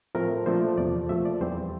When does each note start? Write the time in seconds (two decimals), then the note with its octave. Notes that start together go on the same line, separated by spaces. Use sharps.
0.15 A2 F3 A3 C4 A#4
0.46 A#2 F3 A3 D4 C5
0.78 E2 C3 F3 D5
1.09 A#2 F3 A3 E5
1.25 D5
1.41 E2 E3 G3 C4 C5